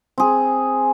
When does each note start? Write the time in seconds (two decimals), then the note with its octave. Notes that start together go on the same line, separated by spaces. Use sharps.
0.18 C4 G#4